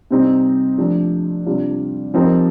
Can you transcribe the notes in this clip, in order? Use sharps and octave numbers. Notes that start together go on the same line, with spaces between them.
C3 G3 C4 D#4
F3 A3 D4 G4
C3 G3 D4 F4
F3 C4 D#4 G4 A#4